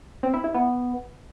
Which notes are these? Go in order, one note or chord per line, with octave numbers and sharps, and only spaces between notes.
C4
E4
E4
B3